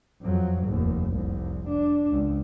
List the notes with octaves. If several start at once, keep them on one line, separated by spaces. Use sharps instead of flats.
F2 F#3
F1 D#2
F1 C2
D4
C#2